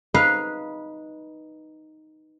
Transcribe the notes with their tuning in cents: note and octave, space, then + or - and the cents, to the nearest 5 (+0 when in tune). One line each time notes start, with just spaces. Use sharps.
D#4 +0 B4 -15 F5 +0